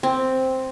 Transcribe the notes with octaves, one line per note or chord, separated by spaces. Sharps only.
C4